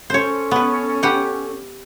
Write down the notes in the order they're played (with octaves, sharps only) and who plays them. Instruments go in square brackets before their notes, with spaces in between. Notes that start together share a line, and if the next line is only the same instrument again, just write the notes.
[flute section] C#4 A4 [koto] C5 C#5
[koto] B3 B4
G4 B4 F#5